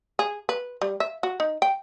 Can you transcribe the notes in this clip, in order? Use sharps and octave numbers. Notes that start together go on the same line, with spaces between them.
G#4
B4
G3
E5
F#4
D#4
G5